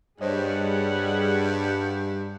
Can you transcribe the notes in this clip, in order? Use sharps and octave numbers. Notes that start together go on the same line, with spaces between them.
G2 G3 G#4 C5 C#5 D#5 F#5